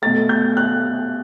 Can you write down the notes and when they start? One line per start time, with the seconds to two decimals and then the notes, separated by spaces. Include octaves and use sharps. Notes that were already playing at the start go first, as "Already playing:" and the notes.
0.02 B2 A3 A6
0.29 G6
0.57 F#6